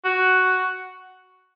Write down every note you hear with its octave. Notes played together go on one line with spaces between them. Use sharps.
F#4